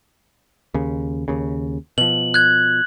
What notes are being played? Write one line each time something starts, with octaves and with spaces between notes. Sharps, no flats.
D#2 C#3
D#2 C#3
B2 F3 F#7
F#6 G#6